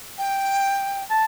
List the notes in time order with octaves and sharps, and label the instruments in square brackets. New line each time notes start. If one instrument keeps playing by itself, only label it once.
[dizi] G5
[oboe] A5